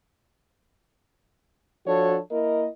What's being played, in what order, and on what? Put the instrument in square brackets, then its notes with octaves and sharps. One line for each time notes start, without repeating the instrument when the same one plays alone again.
[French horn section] F3 D4 F#4 A4 C#5
A#3 E4 A#4 D#5